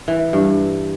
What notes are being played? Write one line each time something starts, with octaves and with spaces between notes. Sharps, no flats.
E3
G2